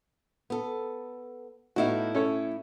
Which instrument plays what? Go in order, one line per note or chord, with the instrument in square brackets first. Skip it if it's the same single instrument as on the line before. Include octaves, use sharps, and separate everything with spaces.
[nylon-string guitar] B3 A4
[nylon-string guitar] A2 E4 F5 [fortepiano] B3 D#4 F#4
[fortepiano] C#4 A4 C#5